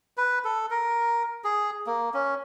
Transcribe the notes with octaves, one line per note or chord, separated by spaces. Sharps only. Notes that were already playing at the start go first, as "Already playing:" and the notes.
B4
A4
A#4
G#4
A#3
C#4